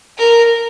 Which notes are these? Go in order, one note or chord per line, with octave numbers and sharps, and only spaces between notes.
A#4